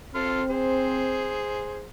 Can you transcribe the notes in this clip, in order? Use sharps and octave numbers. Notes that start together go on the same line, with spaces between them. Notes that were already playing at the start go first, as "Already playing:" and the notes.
C4 A4 C6 F6
G#4 C5